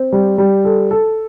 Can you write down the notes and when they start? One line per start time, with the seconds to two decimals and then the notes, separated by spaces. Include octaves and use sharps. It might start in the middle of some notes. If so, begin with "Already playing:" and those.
Already playing: C4
0.12 G3
0.38 G3
0.65 A4
0.91 A4